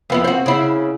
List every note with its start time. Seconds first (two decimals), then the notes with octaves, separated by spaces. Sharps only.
0.10 F2 B3 E4
0.24 C4 F#4
0.46 C#3 E4